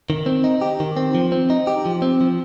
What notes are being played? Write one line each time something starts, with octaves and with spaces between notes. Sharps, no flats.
D#3
C4
D#4
G4
D#3
C4
F3
C4
D#4
G4
F3
C4
F3